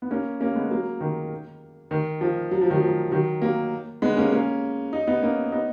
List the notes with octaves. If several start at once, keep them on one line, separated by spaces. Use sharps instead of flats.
B3
A#3 C#4
A#3 C#4
G#3 B3
F#3 A#3
D#3
D#3
F3
F#3
F3
D#3 F#3
F3
D#3 F#3
F#3 A#3
G#3 B3
A#3 C#4
A#3 C#4
D#4
B3 D#4
A#3 C#4
B3 D#4